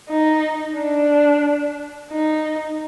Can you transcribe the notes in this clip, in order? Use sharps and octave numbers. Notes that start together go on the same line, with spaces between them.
D#4
D4
D#4